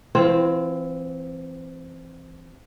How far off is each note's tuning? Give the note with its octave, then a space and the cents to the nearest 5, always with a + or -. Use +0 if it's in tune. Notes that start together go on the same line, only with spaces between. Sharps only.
E3 +25 C4 +0 F4 +15